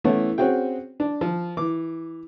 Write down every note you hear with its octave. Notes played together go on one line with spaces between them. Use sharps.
E3 A3 B3 C#4 E4
C4 C#4 F#4 G#4 G5
D4
F3
E3 D6